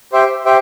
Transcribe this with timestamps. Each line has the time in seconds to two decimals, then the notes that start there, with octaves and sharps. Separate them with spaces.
0.13 G4 C5 E5 G5
0.45 G4 C5 E5 G5